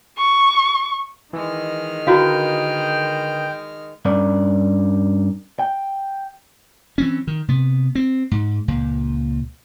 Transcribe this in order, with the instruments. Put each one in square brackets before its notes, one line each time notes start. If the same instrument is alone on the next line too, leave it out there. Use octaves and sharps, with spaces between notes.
[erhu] C#6
[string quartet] D#3 G#3 F6 [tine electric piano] E3
[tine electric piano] D3 A#4 B4 [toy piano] E4 F#4 F5 [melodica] G5
[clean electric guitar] G2 C#4 A#4 D5
G5
[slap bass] E3 C4 C#4
D#3
C3 B3
C4
G#2
C#2 A#2